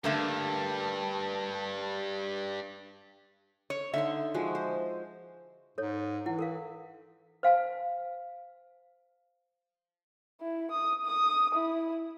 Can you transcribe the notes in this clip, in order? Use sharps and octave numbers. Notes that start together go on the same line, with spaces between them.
G2 D3 A3 A#3 A5
C#5
D3 D#4 E5 C6
F3 G#3 F#4
C5
G#2 A4 C#5
E3 E4 F#5
A4 A#4 F5
C5 F5 G#5 A5
E4
D#6
D#6
E4